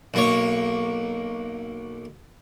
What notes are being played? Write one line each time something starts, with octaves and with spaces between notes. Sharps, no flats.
B1 A#3 C#5